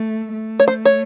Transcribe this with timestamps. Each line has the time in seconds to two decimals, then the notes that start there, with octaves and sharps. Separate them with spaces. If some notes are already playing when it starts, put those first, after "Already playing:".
Already playing: A3
0.33 A3
0.60 C#5
0.68 C5
0.85 C#5